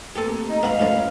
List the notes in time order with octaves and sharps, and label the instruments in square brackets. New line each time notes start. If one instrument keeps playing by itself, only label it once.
[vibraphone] A3 A#3 C4 [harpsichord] G4 A4
[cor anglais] D#4 [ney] D#5
[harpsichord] B2 F#4 B5 [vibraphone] G#3 [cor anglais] F5
[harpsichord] A2 F3 C#4